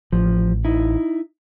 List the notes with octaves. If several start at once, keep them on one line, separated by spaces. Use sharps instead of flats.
A1 F3
D#4 E4